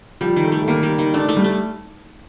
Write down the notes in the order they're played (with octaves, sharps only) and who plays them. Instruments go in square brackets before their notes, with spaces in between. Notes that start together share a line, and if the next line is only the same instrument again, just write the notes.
[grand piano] F3 [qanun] G3
[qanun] D#3
[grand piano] A3
[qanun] G3
[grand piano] A3
[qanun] D#3 [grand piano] A#3
[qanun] G3
D#3
[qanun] A3 [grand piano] D4
[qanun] A3
[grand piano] G3
[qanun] A3